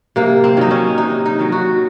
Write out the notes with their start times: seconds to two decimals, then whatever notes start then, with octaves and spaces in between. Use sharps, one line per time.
0.16 C3 A#3
0.44 C4
0.57 D#3 F#3 D#4
0.71 C#4
0.98 C3 D#4
1.26 D#4
1.39 D#3 F#3
1.52 F#4